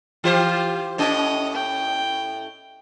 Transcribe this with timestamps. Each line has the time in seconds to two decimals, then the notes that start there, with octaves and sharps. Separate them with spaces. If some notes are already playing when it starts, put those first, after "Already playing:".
0.24 E3 F4 G4 C5
0.98 A2 C#4 D#5
1.55 G5